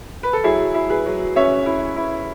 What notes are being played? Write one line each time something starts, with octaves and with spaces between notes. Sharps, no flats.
B4
A4
F#3 E4 G#4
E4
G#4 B4
F#3
C#4 C#5 E5
E4
E4